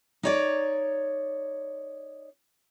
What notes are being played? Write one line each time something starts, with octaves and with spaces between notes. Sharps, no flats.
D#4 C#5 D5